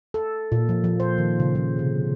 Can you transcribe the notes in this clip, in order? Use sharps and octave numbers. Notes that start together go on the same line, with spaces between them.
A4
A#2
F3
F3
C5
D#3
C#3
F3
C3